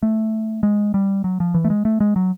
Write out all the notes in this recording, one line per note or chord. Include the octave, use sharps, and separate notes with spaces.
A3
G#3
G3
F#3
F3
E3
A3
G#3
A3
G#3
F#3